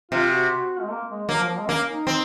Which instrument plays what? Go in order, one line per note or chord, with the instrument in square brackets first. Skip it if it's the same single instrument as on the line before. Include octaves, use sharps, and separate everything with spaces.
[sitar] C3 [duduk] F4
[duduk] F#4
F#4
G#3
A#3
G#3
[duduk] F#3 [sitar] A#3
[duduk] F3
F3
G#3
[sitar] A#3 [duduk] C#4
[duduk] D#4
[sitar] C4